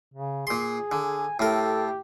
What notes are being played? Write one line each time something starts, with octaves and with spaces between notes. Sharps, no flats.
C#3
A#2 G#4 C6
D3 G#5
A2 G4 A4 A#4